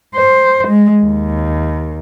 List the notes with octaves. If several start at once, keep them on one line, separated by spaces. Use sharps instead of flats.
C5
G#3
D#2